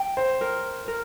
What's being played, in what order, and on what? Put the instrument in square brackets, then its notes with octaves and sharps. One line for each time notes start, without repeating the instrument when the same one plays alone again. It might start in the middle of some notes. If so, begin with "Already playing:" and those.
Already playing: [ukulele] G5
[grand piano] C5
[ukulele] A#4
A#4